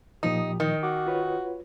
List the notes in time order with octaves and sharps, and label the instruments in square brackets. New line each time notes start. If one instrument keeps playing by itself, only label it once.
[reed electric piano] A#2 F3 D#6 [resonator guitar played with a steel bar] D#4 [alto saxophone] G4
[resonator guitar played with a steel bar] D#3 [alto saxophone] D#5
[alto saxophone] F#4 [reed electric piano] D6
[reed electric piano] F4 B4 C#5